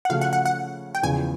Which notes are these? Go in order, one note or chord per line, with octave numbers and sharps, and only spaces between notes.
F#5
C#3 F3 A3 C#4 F#4 F5
F#5
F#5
F#5
G5
E2 C#3 F3 G#5